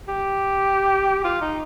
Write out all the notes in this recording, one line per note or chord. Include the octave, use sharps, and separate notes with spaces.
G4
F4
D#4